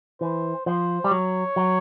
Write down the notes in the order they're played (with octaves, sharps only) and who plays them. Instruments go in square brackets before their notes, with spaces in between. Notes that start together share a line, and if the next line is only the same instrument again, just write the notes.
[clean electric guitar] E3 [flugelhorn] C5
[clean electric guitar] F3 [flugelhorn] C5
[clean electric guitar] G3
[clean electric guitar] F#3 [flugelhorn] C#5
[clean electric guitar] F#3